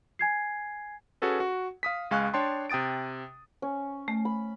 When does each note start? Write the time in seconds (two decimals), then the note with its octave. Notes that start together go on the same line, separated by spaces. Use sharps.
0.19 G#5 G#6 C7
1.22 C#4 F#4 G#4 A4 B4
1.40 F#4
1.83 F5 D#6 B6
2.11 C#2 G#3 F5 G#5 C#6 F#6
2.34 D4 C#5 G5 A5 C6
2.70 C3 G5 D#6 A6 D7
3.62 C#4
4.08 A3
4.25 B5